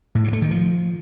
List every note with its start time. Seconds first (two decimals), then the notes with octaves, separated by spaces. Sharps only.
0.15 A2
0.24 G2
0.33 A3
0.42 D#3
0.51 F3